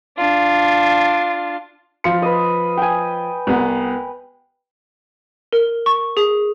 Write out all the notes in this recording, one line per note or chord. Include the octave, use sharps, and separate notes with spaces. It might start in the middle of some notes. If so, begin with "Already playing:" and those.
D4 F4
F3 F5 C6 C#7
B4 D#5
G5 G#5
C2 B3
A#4
C#6
G#4